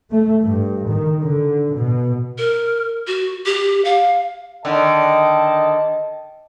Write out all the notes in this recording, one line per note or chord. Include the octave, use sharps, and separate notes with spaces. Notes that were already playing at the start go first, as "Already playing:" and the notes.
A3
G2
D#3
D3
B2
A#4
F#4
G4
F5
D3 D#3 D#5 G5 A5